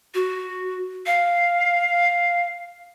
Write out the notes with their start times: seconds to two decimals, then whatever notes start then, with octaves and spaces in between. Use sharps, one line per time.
0.14 F#4
1.06 F5